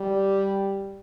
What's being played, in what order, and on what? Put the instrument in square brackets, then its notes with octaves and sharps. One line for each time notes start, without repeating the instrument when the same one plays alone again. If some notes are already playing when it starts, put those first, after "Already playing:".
Already playing: [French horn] G3